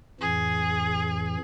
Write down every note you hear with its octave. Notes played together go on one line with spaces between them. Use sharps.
F2 A2 E3 G#4